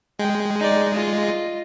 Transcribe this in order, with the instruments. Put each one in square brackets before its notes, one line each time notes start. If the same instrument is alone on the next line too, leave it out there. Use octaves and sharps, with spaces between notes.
[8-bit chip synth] G#3 [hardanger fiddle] G5
[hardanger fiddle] D#4 D5
F4 D#5